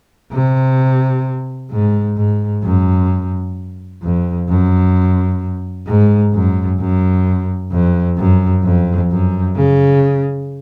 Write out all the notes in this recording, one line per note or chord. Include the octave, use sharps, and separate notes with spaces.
C3
G#2
G#2
F#2
F2
F#2
G#2
F#2
F#2
F2
F#2
F2
F#2
C#3